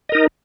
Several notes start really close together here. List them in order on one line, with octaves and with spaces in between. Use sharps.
D#5 A#4 D#4